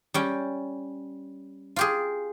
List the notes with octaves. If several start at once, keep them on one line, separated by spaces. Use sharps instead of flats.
G3 C#4 G5
F4 G4 G#4